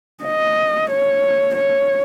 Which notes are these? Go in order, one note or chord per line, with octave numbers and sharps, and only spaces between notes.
D#5
C#5
C#5